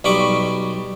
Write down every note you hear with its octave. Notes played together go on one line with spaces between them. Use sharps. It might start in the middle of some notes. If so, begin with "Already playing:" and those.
B1 G3 B5 C#6 D6